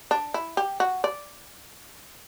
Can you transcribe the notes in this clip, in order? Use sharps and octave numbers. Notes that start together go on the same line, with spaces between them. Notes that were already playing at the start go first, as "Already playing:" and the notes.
D4
E4
G4
F#4
D5